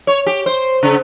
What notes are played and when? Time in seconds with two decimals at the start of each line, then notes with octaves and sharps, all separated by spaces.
0.07 C#5
0.26 G4
0.46 C5
0.83 C#3